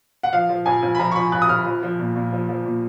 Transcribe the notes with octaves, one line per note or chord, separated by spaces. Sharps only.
F#5
F3 F5
F3
F2 G#5
F2
B5
F3 A#5
C#6
F3 B5
F2 F#6
D#6
F2 F6
F3
F3
A#2
A#2
F3
F3
A#2